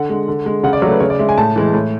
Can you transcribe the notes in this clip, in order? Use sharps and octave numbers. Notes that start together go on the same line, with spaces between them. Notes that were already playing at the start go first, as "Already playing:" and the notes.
Already playing: D3 F#5
G#3
D3
G#3
C#3 F#5
D5
F#3 A3 C#5
B4
C#3 C#5
D5
G#3 E5
G#5
A2 A5
E3 G#3
A2